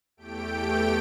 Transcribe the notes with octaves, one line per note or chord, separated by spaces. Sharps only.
E2 A3 G4 G5 D7